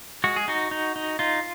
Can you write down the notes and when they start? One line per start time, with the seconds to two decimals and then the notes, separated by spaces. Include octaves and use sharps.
0.24 G#3 F#4
0.36 G#4
0.48 D#4 F#4
0.71 D#4
0.96 D#4
1.19 D#4 F4